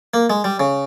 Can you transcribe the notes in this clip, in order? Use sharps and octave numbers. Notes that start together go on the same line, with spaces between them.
A#3
G#3
G3
C#3